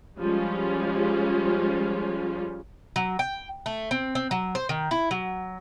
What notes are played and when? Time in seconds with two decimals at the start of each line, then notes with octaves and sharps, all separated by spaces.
0.18 F3 G3 G#3 C#4 F4
2.96 F#3
3.19 G5
3.66 A3
3.91 C4
4.15 C4
4.31 F#3
4.55 C5
4.69 D#3
4.91 E4
5.11 F#3